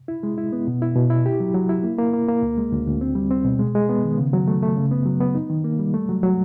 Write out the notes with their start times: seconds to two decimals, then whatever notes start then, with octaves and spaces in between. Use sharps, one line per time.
0.08 E4
0.23 G#3
0.38 E4
0.53 B3
0.67 B2
0.82 E4
0.96 B2
1.10 E4
1.26 G4
1.40 F#3
1.54 F#3
1.69 E4
1.83 A#3
1.99 A#3
2.13 A#3
2.29 A#3
2.42 D2
2.57 G#3
2.72 D2
2.87 D2
3.01 C4
3.15 G3
3.31 C4
3.44 B2
3.59 G#3
3.75 G#3
3.89 B3
4.04 D#3
4.18 C#3
4.33 F#3
4.48 A3
4.62 A3
4.77 C#3
4.91 B3
5.06 F#3
5.21 B3
5.35 D#4
5.50 D#3
5.64 A#3
5.79 G3
5.94 A3
6.09 F#3
6.23 F#3